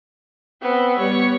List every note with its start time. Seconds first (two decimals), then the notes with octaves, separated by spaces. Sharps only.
0.62 B3 C4
0.98 G3 B3 C#5